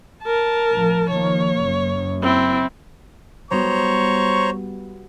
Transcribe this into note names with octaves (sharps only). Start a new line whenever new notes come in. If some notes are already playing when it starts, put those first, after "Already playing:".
A#4 A5
A1 F3
D#3 F3 A#3 C#5
F#1 F#2
C4 E4
G3 B3 F#4 C5 C#5 A#5 C#6